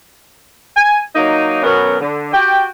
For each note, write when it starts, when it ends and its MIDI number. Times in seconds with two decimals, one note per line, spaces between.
0.76 1.00 80
1.15 1.62 54
1.15 1.62 58
1.15 1.62 63
1.63 1.95 47
1.63 1.95 54
1.63 1.95 59
1.63 1.95 61
1.63 1.95 70
2.00 2.32 50
2.32 2.66 66
2.32 2.66 67
2.32 2.66 79